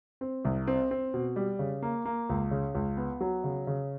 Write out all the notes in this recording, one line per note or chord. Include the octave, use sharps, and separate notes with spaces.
C4
C2
C4
C4
B2
G3
C#3
A#3
A#3
C#2
C#3
C#2
B3
F#3
C#3
C#3